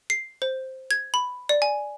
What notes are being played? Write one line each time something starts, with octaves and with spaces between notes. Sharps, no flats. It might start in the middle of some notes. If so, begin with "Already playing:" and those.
C7
C5
G#6
B5
D5
G#5